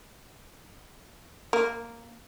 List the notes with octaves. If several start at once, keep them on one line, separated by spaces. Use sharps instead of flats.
A#3